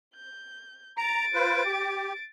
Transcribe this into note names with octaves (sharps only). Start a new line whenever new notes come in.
G6
A#5 A6 D7
F4 B4 C5
G4